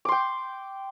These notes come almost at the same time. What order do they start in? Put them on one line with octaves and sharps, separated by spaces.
D6 C6 G5